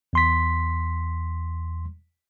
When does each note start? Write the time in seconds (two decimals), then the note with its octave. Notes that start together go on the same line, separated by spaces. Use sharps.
0.13 E2 C6 B6